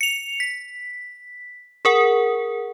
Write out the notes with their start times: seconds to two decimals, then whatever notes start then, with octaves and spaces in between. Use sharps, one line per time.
0.01 C#7 F7
0.40 B6
1.85 G#4 A#4 F#5